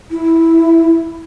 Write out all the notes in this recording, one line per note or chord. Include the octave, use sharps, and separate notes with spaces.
E4